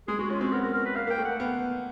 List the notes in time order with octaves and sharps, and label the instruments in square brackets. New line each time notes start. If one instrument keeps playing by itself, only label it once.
[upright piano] G#3 [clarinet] G#4
[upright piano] G#3 [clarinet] F#4
[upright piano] C#4 [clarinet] F4
[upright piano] C4 [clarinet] F#4
[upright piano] B3 [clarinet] A#4
[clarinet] A#4
A#4
B4
[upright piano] A#3 [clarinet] F5
[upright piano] A#3
[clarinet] G5
[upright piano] A3
[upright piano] A#3 [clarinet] F#5
[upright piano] B3 [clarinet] F5